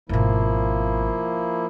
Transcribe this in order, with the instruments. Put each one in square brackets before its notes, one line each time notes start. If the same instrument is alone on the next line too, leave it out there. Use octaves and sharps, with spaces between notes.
[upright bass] G#1 B2 [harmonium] F3 A#3 E4